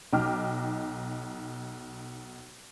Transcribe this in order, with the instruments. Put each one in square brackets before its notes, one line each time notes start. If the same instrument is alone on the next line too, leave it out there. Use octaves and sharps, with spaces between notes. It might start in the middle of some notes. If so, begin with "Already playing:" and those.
[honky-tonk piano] B1 D#4 G5 D6 F6